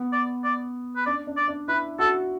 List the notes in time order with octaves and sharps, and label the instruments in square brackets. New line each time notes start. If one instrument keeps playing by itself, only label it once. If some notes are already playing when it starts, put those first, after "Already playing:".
Already playing: [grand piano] B3
[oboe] D5
D5
B4
[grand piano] D4 [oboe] D5
[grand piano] D4
[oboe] D5
[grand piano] D4
[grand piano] E4 [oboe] B4
[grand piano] F#4 [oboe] A4